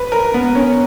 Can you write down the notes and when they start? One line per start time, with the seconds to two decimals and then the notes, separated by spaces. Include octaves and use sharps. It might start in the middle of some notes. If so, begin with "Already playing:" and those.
Already playing: B4
0.12 A#4
0.34 B3
0.55 C#4